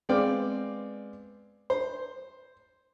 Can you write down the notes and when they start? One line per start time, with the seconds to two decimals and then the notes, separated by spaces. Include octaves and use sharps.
0.09 G#3 B3 C4 D5 F5 G5
1.70 C5